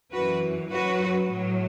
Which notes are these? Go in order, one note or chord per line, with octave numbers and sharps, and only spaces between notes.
F#2 E3 F#4 B4
F#2 F#3 F#4 B4
A2 F#3